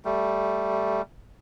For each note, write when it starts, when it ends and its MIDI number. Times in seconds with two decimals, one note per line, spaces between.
0.05 1.02 55
0.05 1.02 57